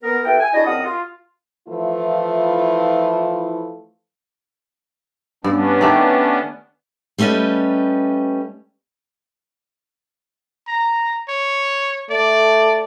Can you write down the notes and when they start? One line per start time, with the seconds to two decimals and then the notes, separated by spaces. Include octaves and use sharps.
0.03 B3 A#4
0.25 E4 G4 A4 B4 G5
0.40 G#5
0.54 D4 E4 F#4 G#4 D#5
0.66 F#2 C4 A#4 D#5 F#5 D#6
0.83 F4
1.67 E3 F3 A3 E4 F4
5.44 G2 B3 C#4 D4
5.81 D#3 A3 G4
7.18 G3 A3 C#4 B4 D#5
10.67 A#5
11.28 C#5
12.10 A3 D5